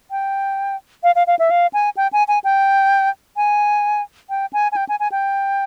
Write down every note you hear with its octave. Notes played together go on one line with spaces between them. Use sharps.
G5
F5
F5
F5
E5
F5
G#5
G5
G#5
G#5
G5
G#5
G5
G#5
G#5
G5
G#5
G#5
G5